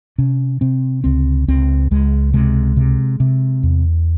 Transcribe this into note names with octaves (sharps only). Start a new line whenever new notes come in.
C3 C#4
C3 C4
C#2 C4
C#2 C4
C#2 G#3
C3 G#3
C3
C3
E2